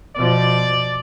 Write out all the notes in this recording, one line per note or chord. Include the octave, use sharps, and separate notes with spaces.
B2 F3 D5